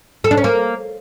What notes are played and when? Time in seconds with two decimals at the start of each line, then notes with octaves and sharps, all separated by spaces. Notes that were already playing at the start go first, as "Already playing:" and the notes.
0.24 A4
0.31 D4
0.37 C#4
0.44 A#3